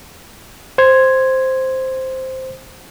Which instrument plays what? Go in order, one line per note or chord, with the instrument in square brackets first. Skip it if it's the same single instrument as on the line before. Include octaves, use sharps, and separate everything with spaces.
[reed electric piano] C5 G#6